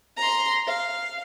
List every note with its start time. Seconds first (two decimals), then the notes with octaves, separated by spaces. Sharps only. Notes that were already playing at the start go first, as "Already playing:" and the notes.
0.17 A#5 C6
0.67 F5